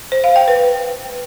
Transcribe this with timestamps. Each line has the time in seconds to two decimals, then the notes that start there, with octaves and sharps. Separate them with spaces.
0.12 C5
0.24 F5
0.36 G5
0.48 B4